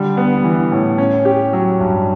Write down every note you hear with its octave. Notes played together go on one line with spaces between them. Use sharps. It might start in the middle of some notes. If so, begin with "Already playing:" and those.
Already playing: D3 G3
B3
E3
A2
C#4
G4
F#3
G2